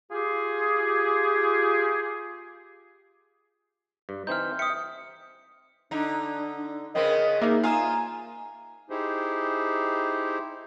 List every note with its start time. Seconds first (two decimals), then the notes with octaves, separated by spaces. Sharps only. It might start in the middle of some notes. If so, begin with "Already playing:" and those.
0.11 F4 G4 G#4
4.09 G2
4.27 E3 C4 D#4 F6 G6
4.59 E5 G5 D#6 C#7
5.91 D3 D4 D#4
6.95 C#3 B3 C4 A#4 D#5
7.42 A#3 D#4 G#4 E5
7.63 F4 F5 G#5 A#5 D#6 E7
8.90 D#4 E4 G4 G#4 C5